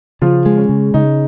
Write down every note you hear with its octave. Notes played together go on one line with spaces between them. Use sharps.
C#3 F3 F4
G#3
C#4
C#3
C#3 D#4